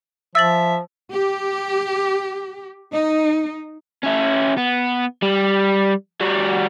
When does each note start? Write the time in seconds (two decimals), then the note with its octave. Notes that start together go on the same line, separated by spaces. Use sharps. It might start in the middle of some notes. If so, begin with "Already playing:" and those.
0.35 F3 E5 E6 A6 F#7
1.11 G4
2.93 D#4
4.03 C#4 E4
4.58 B3
5.22 G3
6.21 G3 F#4